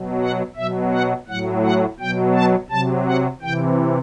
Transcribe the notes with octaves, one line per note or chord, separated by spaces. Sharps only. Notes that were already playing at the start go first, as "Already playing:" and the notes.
Already playing: B2 F#3
F#5
B2 F#3 E5
F#5
A2 F#3 F#5
F#5
B2 F#3 G5
A5
C3 F#3 A5
F#5
C3 E3 G5